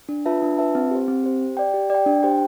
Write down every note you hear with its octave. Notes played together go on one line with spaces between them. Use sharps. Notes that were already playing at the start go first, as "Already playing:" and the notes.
D4
F4 B4 E5 A5
D4
F4 B4 E5 A5
C4
G4 C5
C4
G4 C5
G4
D5 G5
G4
D5 G5
D4
G4 C5 G5